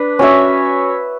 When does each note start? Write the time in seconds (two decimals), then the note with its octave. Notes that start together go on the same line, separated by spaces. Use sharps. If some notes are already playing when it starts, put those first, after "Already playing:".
Already playing: D4 B4
0.19 C#4 F#4 C#5 E5